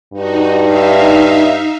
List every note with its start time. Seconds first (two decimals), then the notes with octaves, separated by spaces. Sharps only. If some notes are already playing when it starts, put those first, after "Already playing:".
0.13 G2 D#4 F#4
0.60 D#4 E5 F5